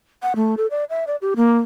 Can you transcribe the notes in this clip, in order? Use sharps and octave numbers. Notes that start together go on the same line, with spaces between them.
F#5
A3
A4
D5
E5
D5
G4
A#3